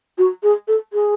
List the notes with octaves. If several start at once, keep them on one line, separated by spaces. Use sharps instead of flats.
F#4
G#4
A4
G#4